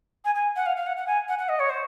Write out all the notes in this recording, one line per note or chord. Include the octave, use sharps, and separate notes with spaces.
G#5
G#5
F#5
F5
F5
F#5
F#5
G#5
F#5
F#5
D#5
C#5
C5